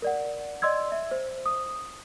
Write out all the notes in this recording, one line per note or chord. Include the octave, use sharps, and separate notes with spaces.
A#4 D5 F#5
D5 D#5 C6 E6 G#6
E5
C5
D#6